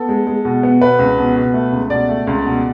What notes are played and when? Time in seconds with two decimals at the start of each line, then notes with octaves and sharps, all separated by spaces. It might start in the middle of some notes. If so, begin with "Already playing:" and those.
Already playing: B3 A4
0.09 G#3
0.27 G#3
0.45 B2
0.63 B3
0.81 B2 B4
0.99 C#2
1.18 B2
1.36 B2
1.54 A3
1.72 C#2
1.90 B2 D5
2.09 A3
2.27 C#2
2.45 B2